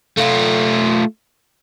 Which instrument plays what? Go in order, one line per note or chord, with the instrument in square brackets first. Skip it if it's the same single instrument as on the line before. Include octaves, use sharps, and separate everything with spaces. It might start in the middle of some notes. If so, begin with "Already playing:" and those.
[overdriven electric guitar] A3 F4